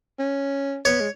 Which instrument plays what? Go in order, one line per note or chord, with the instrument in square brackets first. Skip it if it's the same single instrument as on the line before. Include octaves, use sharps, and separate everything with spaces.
[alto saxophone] C#4
[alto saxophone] B3 [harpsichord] C#5
[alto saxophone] G#3